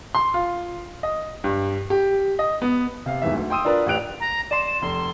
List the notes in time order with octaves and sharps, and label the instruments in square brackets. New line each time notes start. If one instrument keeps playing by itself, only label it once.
[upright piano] C6
F4
D#5
G2
G4
D#5
B3
[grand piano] C3 F5
D1 G#1 E2 E5
D2
G5 C6 D#6 E6 D#7
D4 F4 A#4 B4 D5
A1 G4 F#6 D7 F7
[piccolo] A#5
[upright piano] D5 C6 [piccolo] E7
[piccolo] E7
[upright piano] F1 [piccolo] C6